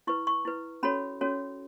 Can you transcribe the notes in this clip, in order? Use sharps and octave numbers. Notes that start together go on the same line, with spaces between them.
E4 B4 C#6
C#6
E4 B4
C#4 F#4 A4 C#5 B5
C#4 F#4 A4 C#5